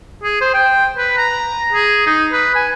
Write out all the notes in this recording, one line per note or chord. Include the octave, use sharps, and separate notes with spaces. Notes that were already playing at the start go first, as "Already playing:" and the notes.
G#4
C5
G5
B4
A#5
G#4
D#4
B4
G#5